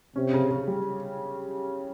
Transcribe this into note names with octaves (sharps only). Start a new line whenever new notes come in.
C3 C#4
C#3
C#3
G3